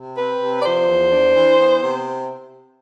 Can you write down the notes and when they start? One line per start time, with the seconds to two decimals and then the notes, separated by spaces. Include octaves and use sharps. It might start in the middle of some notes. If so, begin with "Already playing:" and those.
Already playing: C3
0.16 C4 B4
0.40 C3
0.59 D5
0.63 F3 C5
0.87 E2
1.10 D4
1.34 E3
1.58 B3
1.81 C3